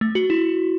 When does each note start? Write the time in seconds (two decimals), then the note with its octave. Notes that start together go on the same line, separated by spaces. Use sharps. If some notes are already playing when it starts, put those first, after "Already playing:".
0.01 A3
0.15 F#4
0.30 E4